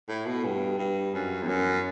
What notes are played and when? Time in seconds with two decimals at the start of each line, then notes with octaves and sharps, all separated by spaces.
0.09 A2
0.26 B2
0.44 G2
0.79 G2
1.14 F#2
1.42 E2
1.48 F#2